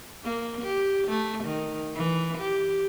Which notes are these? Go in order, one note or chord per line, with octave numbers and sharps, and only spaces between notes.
A#3
G4
A3
D#3
E3
G4